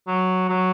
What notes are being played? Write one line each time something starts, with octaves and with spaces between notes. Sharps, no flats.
F#3
F#3